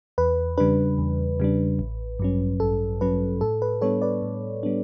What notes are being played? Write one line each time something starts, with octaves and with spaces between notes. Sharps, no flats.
E2 B4
C#3 G3 D4 B4
E2
C#3 G3 D4
A1
G2 F#3 C#4
A1 A4
G2 F#3 C#4 B4
A2 A4
B4
G3 B3 D4 A4 C#5
B4 D5
A2
G3 B3 D4